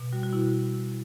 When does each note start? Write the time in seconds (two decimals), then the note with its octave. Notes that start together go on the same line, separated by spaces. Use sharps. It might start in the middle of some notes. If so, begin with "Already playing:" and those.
Already playing: B2
0.12 G3 F#4
0.23 F#4
0.33 B2 E4